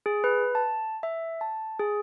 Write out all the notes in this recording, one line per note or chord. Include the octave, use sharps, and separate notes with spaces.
G#4
B4
A5
E5
A5
G#4